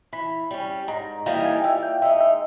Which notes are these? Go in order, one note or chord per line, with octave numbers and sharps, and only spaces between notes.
E3 B5
G3 C#4
G#2 A#5
E3 G3 A#3 D#4
G#5
G5
A#2 E5
G5
G#3 D#4 E5
E5